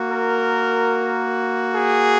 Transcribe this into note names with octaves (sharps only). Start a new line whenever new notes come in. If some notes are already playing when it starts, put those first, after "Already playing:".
Already playing: A#3 F#4
A#4
G#4